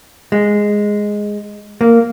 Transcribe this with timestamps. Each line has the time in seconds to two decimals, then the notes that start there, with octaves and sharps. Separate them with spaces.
0.32 G#3
1.81 A#3